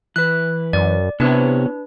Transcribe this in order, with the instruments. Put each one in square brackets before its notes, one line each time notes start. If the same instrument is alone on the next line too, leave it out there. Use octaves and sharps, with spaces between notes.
[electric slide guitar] E3 B4 [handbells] F#6
[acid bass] F#2 [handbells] D5
[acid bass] C3 [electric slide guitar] B3 E4 C#5 [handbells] D4 B4